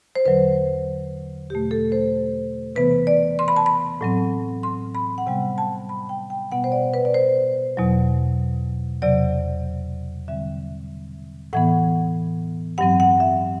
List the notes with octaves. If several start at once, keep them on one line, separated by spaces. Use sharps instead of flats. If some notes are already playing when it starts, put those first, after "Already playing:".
C5
E2 D3 F#3 B4
E2 B2 A3 G4
A4
C5
C3 E3 B3 B4
D5
C6
B5
A5
B5
A2 F#3 C4
C6
B5
F#5
C3 G3 B3 G5
A5
B5
G5
G5
B2 G3 B3 F#5
C5
D5
B4
D5
C5
E2 B2 F#3
E2 C3 F#3 D5
E2 D3 G3 C4 E5
A2 E3 B3 F#5
G2 F#3 C4 F#5
F#5
E5